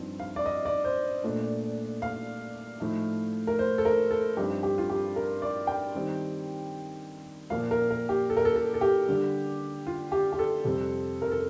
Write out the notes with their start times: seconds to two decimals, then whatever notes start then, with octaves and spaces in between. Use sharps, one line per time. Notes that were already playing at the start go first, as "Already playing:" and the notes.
Already playing: G2 F3 C4 D#4
0.19 F5
0.36 D5
0.46 D#5
0.65 D5
0.84 C5
1.24 A#2 A3 D4
2.02 F5
2.80 A2 F3 A3 D#4
3.47 A#4
3.59 C5
3.78 A4
3.85 A#4
4.11 A4
4.37 G2 F3 C4 D#4 G4
4.63 G4
4.78 F4
4.90 G4
5.16 A#4
5.42 D5
5.67 G5
5.95 D#3 G3 C4 D#4
7.50 A#2 F3 A#3 F5
7.71 A#4
7.91 A#4
8.09 G4
8.30 A4
8.37 A#4
8.45 A4
8.56 A4
8.74 A4
8.81 G4
9.08 D3 G3 D4
9.87 F4
10.12 G4
10.33 G4
10.39 A4
10.64 F2 C3 G3 C4
11.22 A#4
11.31 A4